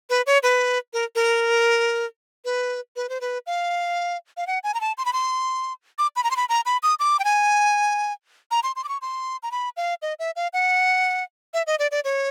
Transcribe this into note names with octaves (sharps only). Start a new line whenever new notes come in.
B4
C#5
B4
A#4
A#4
B4
B4
C5
B4
F5
F5
F#5
G#5
A#5
A5
C6
B5
C6
D6
B5
A#5
C6
B5
A#5
B5
D#6
D6
G5
G#5
A#5
C6
C6
D6
C#6
C6
A#5
B5
F5
D#5
E5
F5
F#5
E5
D#5
D5
D5
C#5